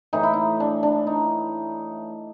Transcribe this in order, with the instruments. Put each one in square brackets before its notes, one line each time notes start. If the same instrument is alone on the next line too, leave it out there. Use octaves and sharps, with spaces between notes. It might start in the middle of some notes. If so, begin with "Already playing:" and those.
[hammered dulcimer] A2 E3 D#4
E4
D#4
D4
D4
D#4